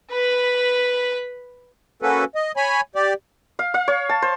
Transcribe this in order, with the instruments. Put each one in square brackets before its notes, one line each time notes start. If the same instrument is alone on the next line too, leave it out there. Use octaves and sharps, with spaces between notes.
[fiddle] B4 B5
[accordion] A#3 C#4 F#4 A4 B4
D#5
C#5 G#5 B5
G4 D5
[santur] F5
F5
C#5
A5
C5